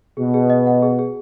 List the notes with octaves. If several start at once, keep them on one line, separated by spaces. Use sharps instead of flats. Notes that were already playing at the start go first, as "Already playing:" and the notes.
B2 G#4
G#4
D#5
F#5
G#4
G#4